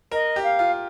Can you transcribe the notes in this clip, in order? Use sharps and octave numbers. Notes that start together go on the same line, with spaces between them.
A#4 D#5
G4
F5
F4